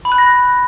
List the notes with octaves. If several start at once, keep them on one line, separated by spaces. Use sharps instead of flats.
B5
F#6
A#6